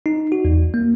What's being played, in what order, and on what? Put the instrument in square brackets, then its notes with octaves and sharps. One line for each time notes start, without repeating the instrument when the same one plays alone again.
[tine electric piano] D#4
F#4
E2
A#3